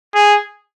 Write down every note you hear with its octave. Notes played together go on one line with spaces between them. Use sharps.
G#4